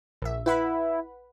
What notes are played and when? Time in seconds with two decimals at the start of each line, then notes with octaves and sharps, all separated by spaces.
0.22 A#1 E5
0.46 E4 B4 F#5 B5